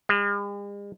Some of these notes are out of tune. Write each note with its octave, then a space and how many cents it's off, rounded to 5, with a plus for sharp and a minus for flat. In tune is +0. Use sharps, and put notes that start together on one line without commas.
G#3 -45